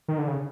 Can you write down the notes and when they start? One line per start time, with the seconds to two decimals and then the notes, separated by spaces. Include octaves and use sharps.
0.08 D#3
0.18 D3
0.28 C#3